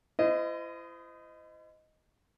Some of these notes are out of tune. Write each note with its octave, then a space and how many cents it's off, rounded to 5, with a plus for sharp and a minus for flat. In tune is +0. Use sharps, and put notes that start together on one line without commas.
E4 +40 C5 -35 D#5 +0